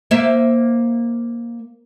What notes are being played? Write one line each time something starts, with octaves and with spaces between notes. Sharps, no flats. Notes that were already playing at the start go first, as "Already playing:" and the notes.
A#3 C5 E5